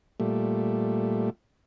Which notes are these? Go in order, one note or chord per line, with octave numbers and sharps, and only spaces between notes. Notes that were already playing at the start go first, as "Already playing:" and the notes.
A#2 G3 A3